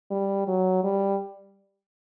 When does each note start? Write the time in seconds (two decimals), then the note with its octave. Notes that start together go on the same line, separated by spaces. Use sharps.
0.11 G3
0.48 F#3
0.84 G3